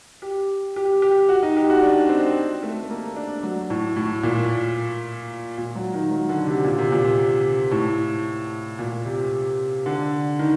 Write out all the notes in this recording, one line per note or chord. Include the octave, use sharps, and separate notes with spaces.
G4
G4
G4
F#4
D#4
G4
F#4
D4
C4
A3
A#3
D4
F#3
A2
A2
A#2
A#2
F#3
D#3
F#3
D3
C3
A#2
C3
A#2
A2
A#2
C3
D3
D#3